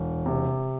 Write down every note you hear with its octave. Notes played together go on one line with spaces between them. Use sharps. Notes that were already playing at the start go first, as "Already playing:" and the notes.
Already playing: E1
C3